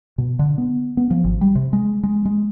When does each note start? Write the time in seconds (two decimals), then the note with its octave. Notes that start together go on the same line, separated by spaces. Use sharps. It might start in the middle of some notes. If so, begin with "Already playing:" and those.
0.18 B2
0.39 D3
0.58 B3
0.97 B3
1.11 F3
1.24 G#1
1.41 G3
1.55 C3
1.73 G#3
2.03 G#3
2.25 G#3